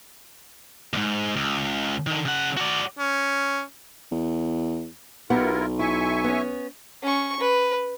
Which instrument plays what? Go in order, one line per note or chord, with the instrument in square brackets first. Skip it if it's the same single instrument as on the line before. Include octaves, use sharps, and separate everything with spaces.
[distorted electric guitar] D#2 G#2
C#2
D3 D#3
C#3 F#5
F#4 D5
[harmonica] C#4
[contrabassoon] E2
[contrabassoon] B1 [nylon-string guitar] B3 G4 F#5 [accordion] E4 F4 A#4
[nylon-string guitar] E4 [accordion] E5 G#5 C#6
[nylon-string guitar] B3 C#4
[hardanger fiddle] C#4 C#6
B4